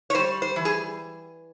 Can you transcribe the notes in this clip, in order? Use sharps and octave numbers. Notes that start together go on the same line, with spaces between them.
C#5
G3 C5
C5
E3
G#4